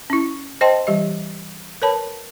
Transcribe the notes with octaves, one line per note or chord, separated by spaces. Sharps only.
C#4 E4
C5 D#5 G5 A5 C6
E3 G3 G4 D#5
A#4 B4 C#5 A5 B5